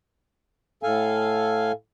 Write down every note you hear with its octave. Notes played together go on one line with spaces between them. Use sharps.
A2 A4 F5 G#5